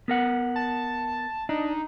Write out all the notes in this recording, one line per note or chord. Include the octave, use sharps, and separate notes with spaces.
B3 A#4 F#5
A5
D4 D#4